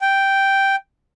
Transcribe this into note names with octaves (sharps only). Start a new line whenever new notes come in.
G5